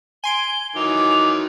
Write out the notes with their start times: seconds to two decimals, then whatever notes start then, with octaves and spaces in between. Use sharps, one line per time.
0.24 G#5 C6 D7 G7
0.76 D#3 E3 F#3 D#5 D6 F7